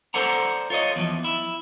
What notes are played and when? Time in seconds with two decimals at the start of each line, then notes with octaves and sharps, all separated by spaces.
0.14 A4 C5 D5 F#5 A#5
0.70 F4 C#5 D#5
0.96 E2 F3
1.24 E4